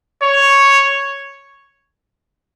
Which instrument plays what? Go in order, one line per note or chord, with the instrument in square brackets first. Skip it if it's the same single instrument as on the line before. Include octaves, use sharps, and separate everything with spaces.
[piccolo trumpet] C#5